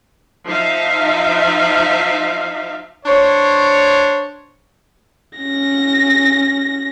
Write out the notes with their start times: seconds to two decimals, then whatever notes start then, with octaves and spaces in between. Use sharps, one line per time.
0.46 F3 D#4 E5 F5
3.06 D4 C5 C#5
5.39 C#4 A#6